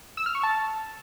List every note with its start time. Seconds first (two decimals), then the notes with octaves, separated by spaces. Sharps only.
0.17 E6
0.26 F6
0.35 C#6
0.43 A5